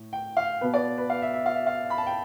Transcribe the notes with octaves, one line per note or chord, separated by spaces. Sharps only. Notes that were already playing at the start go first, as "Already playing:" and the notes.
Already playing: A2
G5
F5
B2 B3 B4
D5
B4
F5
E5
E5
F5
E5
F5
B5
A5
G5